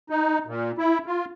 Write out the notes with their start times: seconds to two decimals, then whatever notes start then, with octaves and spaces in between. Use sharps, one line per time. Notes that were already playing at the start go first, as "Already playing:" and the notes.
0.10 D#4
0.47 A#2
0.78 E4
1.07 F4